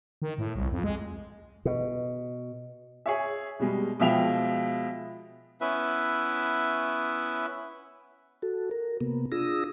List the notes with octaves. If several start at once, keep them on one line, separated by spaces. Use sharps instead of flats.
D#3
A2
C2
F2
G#3
B2
G#4 C#5 E5
B2 G3 G#3
B2 F3 G#3 E5 G5 F7
B3 C#4 E4 B4 E5
F#4 A4
A#4
C3 A#3 B3
D4 F4 G#4 D#6 E6 A#6